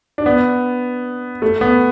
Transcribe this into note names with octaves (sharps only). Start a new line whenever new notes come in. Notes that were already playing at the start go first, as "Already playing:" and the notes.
D4
B3
A3
B3